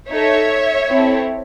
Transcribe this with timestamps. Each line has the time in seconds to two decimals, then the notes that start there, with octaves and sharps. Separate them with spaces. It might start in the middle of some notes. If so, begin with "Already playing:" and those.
0.11 D#4 A4 C#5 E5
0.89 C4 E4 A4